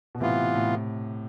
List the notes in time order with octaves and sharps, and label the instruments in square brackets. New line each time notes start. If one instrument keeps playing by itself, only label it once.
[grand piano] B2
[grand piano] A2 C3 [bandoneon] E3 B3 F4
[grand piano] A2